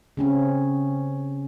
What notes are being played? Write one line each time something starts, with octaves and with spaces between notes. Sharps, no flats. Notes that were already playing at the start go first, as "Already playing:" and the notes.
C#3 C4 C#4